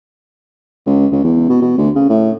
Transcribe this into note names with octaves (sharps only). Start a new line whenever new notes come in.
C#2
C#2
E2
B2
B2
D2
C#3
A2